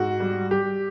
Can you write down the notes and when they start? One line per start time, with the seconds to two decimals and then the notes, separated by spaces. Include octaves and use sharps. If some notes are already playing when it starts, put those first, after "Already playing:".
Already playing: G#2 F#4
0.20 G3
0.51 G3 G4